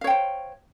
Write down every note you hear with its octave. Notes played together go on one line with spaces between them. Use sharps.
C5 C#5 F5 G5